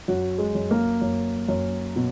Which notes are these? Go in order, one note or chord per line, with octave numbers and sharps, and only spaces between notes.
F#2 F#4
G#3
F#2
A#3
F#2
F#2
B2